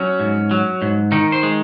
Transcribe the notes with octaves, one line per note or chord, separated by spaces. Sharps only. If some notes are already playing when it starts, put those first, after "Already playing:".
Already playing: F#3 C#4
G#2
F#3
G#2
D#3 D#4
C5
G#3